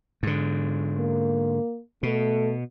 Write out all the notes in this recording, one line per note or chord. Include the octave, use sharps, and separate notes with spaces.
G#2 D3
A#3
B2 A3